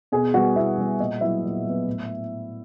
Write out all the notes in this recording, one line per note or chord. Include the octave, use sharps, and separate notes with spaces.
B2 G#4 G#5
G3 B3 F#4 F#5
B2 E4 E5
G3 B3
A#2 D#5
F#3 B3 E4 E5
A#2
F#3 B3
A2